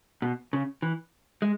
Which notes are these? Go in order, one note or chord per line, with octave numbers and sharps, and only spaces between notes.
B2
C#3
E3
G#3